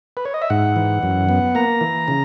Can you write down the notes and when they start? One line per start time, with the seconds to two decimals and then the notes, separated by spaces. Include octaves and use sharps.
0.17 B4
0.25 C#5
0.34 D#5
0.42 E5
0.50 G#2 F#5
0.76 E3
1.03 F#2
1.29 B3
1.55 A#3 A#5
1.81 E3
2.08 C#3